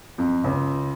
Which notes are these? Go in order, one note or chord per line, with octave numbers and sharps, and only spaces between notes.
F2
C#2